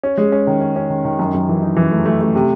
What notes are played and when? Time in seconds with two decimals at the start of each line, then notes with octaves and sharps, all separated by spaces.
0.03 C#4
0.18 G#3
0.32 C#4
0.47 D#3
0.61 C#4
0.76 C#4
0.90 D#3
1.05 D#3
1.19 F#2
1.34 F#2
1.49 E3
1.62 D#4
1.77 E3
1.92 A3
2.05 A3
2.21 A3
2.35 C3